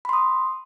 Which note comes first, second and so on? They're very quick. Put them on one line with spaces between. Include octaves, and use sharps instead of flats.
B5 C6 D#6